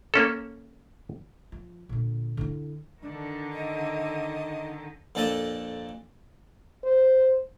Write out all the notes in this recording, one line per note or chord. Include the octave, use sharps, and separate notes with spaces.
A#3 C#4 A4
F3
A#2 D3
D3 E4
D3 D#3 D4
D#4 D#5
F2 A#2 D4 A4 D#5 D#6
C5